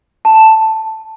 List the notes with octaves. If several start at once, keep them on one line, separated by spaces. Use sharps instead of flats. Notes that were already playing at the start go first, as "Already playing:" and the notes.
A5